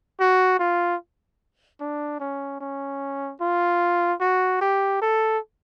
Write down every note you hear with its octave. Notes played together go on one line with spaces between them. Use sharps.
F#4
F4
D4
C#4
C#4
F4
F#4
G4
A4